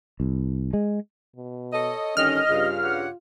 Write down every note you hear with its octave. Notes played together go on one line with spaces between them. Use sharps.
C2
G#3
B2
A4 C#5 D#5
G2 D3 D#3 C#4 D#5 F6
G2 C#3 F4
G4 C#5 F#5